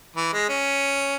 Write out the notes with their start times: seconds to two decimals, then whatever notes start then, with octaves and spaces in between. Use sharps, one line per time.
0.16 E3
0.33 G#3
0.49 C#4